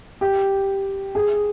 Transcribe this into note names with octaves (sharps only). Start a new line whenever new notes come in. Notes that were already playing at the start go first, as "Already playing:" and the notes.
G4
G#4